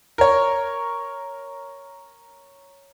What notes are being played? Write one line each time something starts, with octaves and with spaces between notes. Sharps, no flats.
A#4 C#5